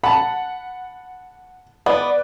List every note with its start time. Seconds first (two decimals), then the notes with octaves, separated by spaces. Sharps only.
0.04 F#5 A5 B5
1.86 B3 B4 D5